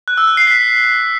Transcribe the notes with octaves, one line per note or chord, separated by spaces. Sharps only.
F#6
E6
F#6
C7
B6